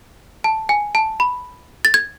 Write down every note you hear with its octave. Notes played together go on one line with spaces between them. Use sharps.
A5
G#5
A5
B5
A6
G#6